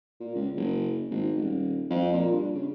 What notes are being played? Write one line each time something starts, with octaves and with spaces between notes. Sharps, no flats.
A#2
C#2
F#1
G#1
D#1
F2
A#2
G2
C#3